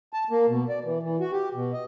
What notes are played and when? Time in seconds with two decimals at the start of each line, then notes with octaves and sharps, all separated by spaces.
0.13 A5
0.30 A#3
0.48 B2
0.69 D5
0.84 E3
1.03 E3
1.21 F#4
1.32 G4
1.54 B2
1.73 D#5